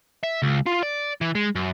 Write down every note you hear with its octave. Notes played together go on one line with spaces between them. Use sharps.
E5
C#2
F4
D5
E3
G#3
F#2